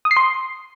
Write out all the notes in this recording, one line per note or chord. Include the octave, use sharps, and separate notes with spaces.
D#6
C7
C6